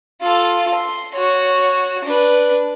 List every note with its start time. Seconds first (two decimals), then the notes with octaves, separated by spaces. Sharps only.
0.22 F4 A4
0.74 C6
1.15 F#4 C#5
2.05 D4 B4